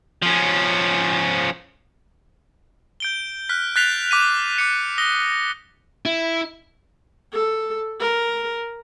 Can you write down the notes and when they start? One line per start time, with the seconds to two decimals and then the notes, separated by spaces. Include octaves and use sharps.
0.22 F3 C#4
3.00 G6 D7 G7
3.49 F6 F#6 B6
3.76 F#6 G6 A6 B6 C7 F7
4.11 D6 B6 D#7
4.58 D6 A6 C#7
4.98 D#6 A#6 G7
6.05 E4
7.33 A4
8.00 A#4